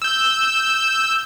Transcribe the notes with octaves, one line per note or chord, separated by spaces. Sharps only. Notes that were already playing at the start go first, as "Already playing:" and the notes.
E6 G6